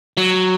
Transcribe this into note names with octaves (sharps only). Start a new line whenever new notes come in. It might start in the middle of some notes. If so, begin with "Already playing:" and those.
F#3